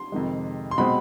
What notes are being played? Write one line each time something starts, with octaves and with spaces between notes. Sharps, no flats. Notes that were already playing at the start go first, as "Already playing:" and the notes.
Already playing: C6
F2 C3 D#3 G#3
C6
B2 G#3 C4 B5